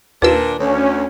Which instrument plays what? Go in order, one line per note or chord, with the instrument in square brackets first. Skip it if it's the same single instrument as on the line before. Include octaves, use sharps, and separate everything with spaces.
[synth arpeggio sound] D#2 F4 E6 [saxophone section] A#2 D4 [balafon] B4
[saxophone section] D2 [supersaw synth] C#4